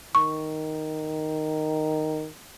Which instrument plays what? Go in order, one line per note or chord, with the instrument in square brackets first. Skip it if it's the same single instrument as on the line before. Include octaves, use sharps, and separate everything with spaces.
[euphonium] D#3 [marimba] C#6